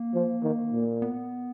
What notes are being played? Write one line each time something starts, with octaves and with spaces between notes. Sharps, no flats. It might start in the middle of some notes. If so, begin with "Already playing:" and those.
Already playing: A#3
F3
D#3
A#2
B3